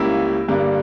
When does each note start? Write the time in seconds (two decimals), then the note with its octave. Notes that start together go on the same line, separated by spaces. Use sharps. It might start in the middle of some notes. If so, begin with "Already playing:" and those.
Already playing: C#2 C#3 G3 A#3 E4
0.48 G2 D3 G3 A#3 D4